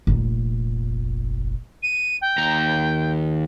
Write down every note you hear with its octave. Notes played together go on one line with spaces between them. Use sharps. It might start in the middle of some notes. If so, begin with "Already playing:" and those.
F1 A#1
D#7
G5
D#2 A#5